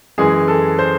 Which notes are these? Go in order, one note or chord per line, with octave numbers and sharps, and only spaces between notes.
F#2 E3 G#3 G#4
A4
C5